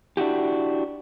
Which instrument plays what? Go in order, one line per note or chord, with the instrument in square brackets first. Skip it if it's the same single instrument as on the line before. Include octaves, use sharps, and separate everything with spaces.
[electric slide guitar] D4 E4 F#4 G4